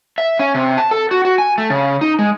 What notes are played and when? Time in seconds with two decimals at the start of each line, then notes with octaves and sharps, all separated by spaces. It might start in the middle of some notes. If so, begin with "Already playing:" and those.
0.18 E5
0.39 C#4
0.55 C3
0.77 A5
0.91 A4
1.11 F#4
1.25 F#4
1.38 G#5
1.58 A3
1.70 C#3
2.01 D#4
2.19 G#3